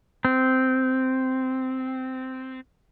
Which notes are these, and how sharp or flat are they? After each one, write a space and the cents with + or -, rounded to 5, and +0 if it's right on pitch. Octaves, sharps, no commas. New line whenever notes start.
C4 -10